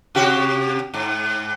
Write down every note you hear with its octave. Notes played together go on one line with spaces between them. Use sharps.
C3 F#4 G4
G#2